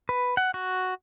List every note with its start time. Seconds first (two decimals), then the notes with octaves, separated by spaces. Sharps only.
0.09 B4
0.37 F#5
0.54 F#4